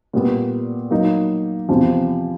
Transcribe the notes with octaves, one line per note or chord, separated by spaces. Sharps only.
A#2 G3 B3
F#3 A#3 D#4
E2 C3 F3